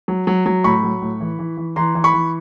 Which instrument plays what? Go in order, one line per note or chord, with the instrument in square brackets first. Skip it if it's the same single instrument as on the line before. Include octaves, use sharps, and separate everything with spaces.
[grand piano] F#3
F#3
F#3
A2 B5 C#6
F#3
A2
E3
E3
E3
E3 A#5 C6
E3
B5 C#6
E3